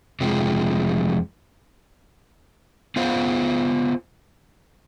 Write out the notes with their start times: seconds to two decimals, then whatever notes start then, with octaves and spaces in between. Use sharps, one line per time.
0.21 F2 C3 F3 G#3
2.96 B3 F4 C5 F5